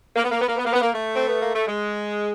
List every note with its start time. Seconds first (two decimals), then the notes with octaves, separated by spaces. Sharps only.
0.15 A#3
0.24 B3
0.31 A#3
0.41 B3
0.48 A#3
0.56 B3
0.65 A#3
0.73 B3
0.81 A#3
0.91 A3
1.15 C4
1.28 B3
1.41 A#3
1.55 A3
1.67 G#3